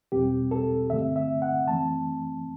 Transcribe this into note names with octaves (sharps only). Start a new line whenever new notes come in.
E2 B2 G3 C4 G4
A4
G2 D3 A3 C4 E5
E5
F#5
F#2 E3 A3 C4 A5